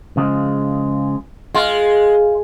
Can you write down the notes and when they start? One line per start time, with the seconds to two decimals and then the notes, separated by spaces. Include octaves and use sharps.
0.17 C#3 F3 G#3
1.55 G#3 F4